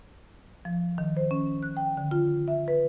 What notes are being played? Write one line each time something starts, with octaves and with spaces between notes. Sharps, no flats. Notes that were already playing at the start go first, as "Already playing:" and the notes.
F3
D#3
C5
C#4
F#6
G5
D3
F4
E5
B4